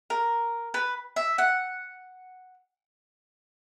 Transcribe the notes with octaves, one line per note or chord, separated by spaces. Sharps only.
A#4
B4
E5
F#5